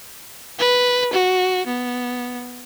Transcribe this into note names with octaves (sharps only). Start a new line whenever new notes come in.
B4
F#4
B3